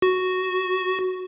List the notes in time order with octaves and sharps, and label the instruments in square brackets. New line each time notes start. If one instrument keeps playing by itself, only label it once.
[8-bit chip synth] F#4